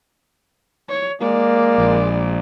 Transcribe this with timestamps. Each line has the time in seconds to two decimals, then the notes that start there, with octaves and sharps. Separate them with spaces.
0.89 C#5
1.21 G#3 A#3 D5
1.78 A#1